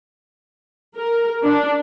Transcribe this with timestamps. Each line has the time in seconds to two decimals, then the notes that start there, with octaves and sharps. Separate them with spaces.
0.96 A#4
1.43 D4